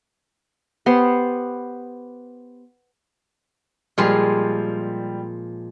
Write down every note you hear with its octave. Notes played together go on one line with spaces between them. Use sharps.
B3 G4 C5 C6
A#2 F3 G3 G#3